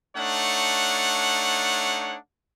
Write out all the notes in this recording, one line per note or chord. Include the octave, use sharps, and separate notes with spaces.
A3 D4 D#4 C#5 F#5